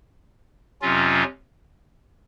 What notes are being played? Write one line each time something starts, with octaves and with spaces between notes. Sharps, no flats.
F2 C3 F#3 C#4 F4